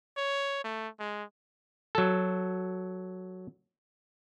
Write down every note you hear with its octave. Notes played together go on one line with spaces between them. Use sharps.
C#5
A3
G#3
F#3 A4